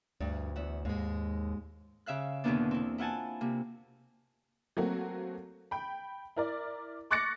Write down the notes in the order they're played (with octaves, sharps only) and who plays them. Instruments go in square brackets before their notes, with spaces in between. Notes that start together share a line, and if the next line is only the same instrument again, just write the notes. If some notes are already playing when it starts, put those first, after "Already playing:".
[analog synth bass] D2 [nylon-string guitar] G2
[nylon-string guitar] E2 E5 F#5
[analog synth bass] D#2 [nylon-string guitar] G#2 G#3
[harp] C#3 E5 F5 F#6
E2 B2 D3 A#3 B3 D4
C4 E4
E4 F4 F#5 G#5 A5
C3 A#3
[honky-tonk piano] F#3 A3 A#3 C4 F#4
G5 B5
E4 A#4 D5
C#6 D6 F#6 A6 A#6 C#7